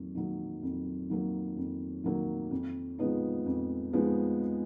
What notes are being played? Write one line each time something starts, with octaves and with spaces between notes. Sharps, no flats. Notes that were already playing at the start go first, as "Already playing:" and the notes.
Already playing: F2 D#3 F#3 A#3
D#3 F#3 A#3
F2
D#3 F#3 A#3
F2
D#3 F#3 A#3
F2
F3 G#3 B3 D#4
F2
F3 G#3 B3 D#4